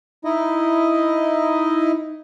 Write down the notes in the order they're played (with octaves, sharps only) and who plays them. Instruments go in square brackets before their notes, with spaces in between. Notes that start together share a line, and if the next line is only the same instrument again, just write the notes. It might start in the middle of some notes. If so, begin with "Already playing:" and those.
[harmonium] D#4 E4 D#5